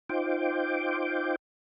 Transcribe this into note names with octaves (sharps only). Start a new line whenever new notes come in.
D#4 F4 C5 G5 D6